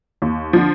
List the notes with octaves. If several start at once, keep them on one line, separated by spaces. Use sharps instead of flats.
D#2
D3 F3